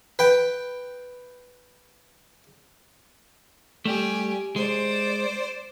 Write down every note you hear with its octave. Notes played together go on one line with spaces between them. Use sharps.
B4 G5
G3 A3 G4 G#5
G#3 C5 D5